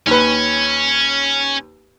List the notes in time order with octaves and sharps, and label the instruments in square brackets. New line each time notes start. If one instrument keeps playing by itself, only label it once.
[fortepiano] D#2 B4 [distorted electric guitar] C#4